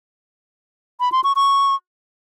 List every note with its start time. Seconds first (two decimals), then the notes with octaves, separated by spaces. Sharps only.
1.00 B5
1.12 C6
1.24 C#6
1.36 C#6